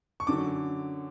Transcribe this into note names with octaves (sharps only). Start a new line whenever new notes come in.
C#6
F#2 D3 F#3 D6